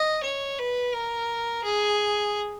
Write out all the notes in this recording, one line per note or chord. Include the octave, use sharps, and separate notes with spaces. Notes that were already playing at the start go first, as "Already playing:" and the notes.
Already playing: D#5
C#5
B4
A#4
G#4